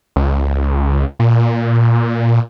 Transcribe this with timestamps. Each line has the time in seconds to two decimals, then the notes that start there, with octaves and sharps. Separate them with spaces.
0.16 C#2
1.19 A#2